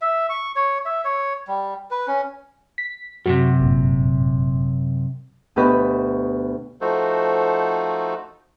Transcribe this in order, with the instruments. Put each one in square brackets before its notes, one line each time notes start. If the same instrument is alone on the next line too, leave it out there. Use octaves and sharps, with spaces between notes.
[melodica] E5
C#6
C#5
E5
C#5
G3
B4
C#4
[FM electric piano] B6
[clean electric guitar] F#2 A2 C3 [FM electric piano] F#4
[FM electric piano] G1 A#2
[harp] D2 B2 G4 B4 D#5 B5
[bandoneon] F3 A3 D#4 F#4 A4 C5